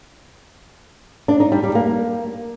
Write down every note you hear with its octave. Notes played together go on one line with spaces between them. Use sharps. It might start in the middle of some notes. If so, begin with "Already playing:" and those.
D4
D#4
G3
G3
A#3